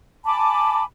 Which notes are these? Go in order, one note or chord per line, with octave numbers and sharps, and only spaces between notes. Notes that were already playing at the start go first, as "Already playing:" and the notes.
G#5 A5 B5 D6